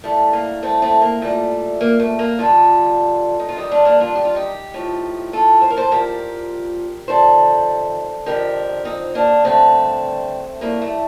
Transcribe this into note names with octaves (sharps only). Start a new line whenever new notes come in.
A2 G3 A3
A#3
A3 C4
A3 C4
A#3
A#2 G3 A3
A#3
A3
A#3
G2 D3 G3 F4 A4
D#4
F4
G2 D#3 G3 D#4 G4
D4 F4
A#3 D4
D4 F4
G4
F4
D#4 G4
A2 F3
F4 A4
C5
A#4
A4 C5
A#2 F3 G4 A#4
F2 C3 D#3 G3 A4 C5
F2 D3 F3 G4 A#4
C4 D#4
A#3 D4
G2 D3 G3 A3 C4
A2 G3 A#3
A3